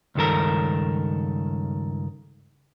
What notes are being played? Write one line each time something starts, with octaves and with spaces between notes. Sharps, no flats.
C#2 G2 D#3 A4 A#4